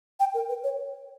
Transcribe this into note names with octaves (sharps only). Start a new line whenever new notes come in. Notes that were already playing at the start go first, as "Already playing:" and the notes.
G5
A#4
B4
C#5